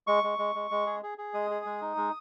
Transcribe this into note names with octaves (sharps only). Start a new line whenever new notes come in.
G#3 C#6
G#3
G#3
G#3
G#3
G#4
G#4
G#4
G#3 D#6
G#4
G#3
D#4
G#3